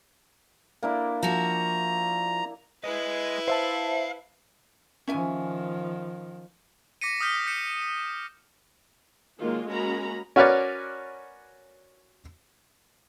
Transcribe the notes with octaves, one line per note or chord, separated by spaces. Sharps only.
A#3 D4 E4
F3 F#4 A#5
E4 G#4 B4 D#5
C5 E5 F5 A5
D#3 F3 C#4 E5 G#5
D6 A#6 B6 C#7 D#7
D#6 F6 G6 B6 G7
G6 C#7 E7
B6
D#3 F#3 G#3 A#3 F4
G#3 A#3 C#4 F#4 A#5 B5
C#4 F#4 A#4 B4 C#5 D5